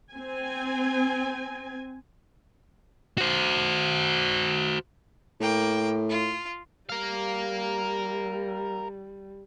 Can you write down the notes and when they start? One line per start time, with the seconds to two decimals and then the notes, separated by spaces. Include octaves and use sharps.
0.12 C4 G#5
3.18 F#4 C5
5.40 A2 A#3 G5
6.09 F4
6.89 G3 A#4 F5